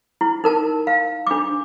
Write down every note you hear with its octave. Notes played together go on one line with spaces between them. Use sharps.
E4
D#4 A#4 A5
F5
D4 D6